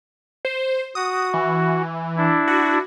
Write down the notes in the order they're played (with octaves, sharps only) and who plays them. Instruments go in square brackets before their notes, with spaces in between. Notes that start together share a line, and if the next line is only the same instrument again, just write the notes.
[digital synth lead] C5
[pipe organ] F#4 [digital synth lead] D#6
[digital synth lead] E3
[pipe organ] D4 E4
[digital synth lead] F#4